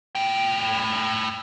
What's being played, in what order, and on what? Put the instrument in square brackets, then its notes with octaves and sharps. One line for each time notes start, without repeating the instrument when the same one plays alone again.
[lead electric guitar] A2 G5